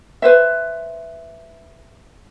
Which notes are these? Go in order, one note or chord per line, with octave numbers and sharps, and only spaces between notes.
B4 C5 E5